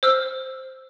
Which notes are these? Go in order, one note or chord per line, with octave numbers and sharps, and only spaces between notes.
C5 E6 F6